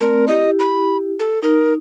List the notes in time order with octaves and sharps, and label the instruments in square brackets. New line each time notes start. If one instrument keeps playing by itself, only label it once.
[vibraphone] A3 C4 D5 [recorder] A#4
[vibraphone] E4 G4 [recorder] D#5
[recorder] B5
A4
[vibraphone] D#4 [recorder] A#4